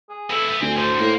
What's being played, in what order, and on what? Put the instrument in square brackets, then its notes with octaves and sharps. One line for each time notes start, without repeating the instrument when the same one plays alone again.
[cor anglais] G#4
[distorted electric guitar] B2 E4 [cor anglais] A4
[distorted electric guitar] A3 B3
[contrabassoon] D2 [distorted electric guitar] C4 [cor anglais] G#5
[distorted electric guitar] A2 D3 [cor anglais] C5
[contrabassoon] A2 [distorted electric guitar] A#3